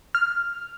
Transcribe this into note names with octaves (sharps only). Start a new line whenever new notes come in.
F6